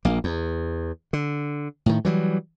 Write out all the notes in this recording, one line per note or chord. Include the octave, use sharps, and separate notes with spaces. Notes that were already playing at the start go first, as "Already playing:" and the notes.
A#1 A#3
E2
D3
A2 D#3
E3 F#3 G3